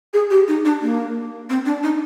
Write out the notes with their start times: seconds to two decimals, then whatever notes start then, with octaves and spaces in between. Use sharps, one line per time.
0.14 G#4
0.30 G4
0.48 D#4
0.65 D4
0.82 A#3
1.50 C4
1.66 D4
1.83 D#4